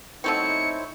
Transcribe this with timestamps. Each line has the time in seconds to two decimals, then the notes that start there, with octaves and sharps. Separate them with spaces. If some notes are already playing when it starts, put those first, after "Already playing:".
0.24 B2 A3 C4 D#4 E4 C5 C#5 C#7